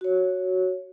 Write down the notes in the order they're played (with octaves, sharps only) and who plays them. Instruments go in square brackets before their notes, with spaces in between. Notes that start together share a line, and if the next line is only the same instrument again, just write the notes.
[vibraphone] F#4 C#5